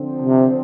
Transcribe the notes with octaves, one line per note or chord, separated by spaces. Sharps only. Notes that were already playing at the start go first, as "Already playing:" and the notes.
Already playing: D3 F3 C4
C3